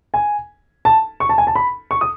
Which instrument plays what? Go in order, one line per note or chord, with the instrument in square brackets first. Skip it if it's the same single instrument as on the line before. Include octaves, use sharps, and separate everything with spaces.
[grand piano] G#5
A5
C#6
A5
G#5
A5
B5
C#6
D#6